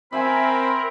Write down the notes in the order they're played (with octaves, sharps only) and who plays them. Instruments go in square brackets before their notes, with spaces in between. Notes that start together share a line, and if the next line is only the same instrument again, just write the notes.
[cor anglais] C4 [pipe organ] A#4 [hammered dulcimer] E5 G#5 C6 [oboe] B5